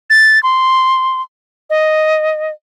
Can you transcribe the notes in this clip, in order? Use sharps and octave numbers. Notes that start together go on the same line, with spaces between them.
A6
C6
D#5